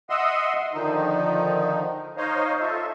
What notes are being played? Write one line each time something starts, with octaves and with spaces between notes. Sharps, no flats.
D#5 E5 F#5 C6 D#6 E6
D3 D#3 F3 D#4
D#4 C5 C#5 D#5 F5
F4 A4 E5